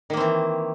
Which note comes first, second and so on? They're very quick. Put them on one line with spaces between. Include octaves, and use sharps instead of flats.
D#3 A#3 C4 E3